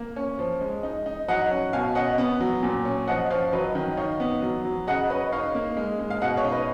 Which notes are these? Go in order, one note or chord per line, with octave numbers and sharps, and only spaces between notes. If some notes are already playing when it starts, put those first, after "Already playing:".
Already playing: A#3
C#4
F3
G#3
D#4
D#4
F#3 D#5 F#5
C#4
B2 F5 G#5
C#4 D#5 F#5
B3
F#3
A#2
C#4
F3 D#5 F#5
F3 C#5 F5
F#3 B4 D#5
D#3
D#4 C#5 F5
B3
F#3
F#3
C#3 D#5 F#5
C#4 B4 D#5
D#4 C#5 F5
A#3
G#3
G#3
F5
B2 D#5 F#5
C#5 F5
D#4
B4 D#5